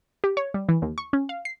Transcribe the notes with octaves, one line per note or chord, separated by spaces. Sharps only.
G4
C#5
G3
E3
D#2
C#6
C#4
F5
C7